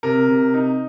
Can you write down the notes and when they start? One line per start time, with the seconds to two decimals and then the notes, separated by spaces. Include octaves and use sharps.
0.03 C3 A#4
0.29 C3
0.54 D#4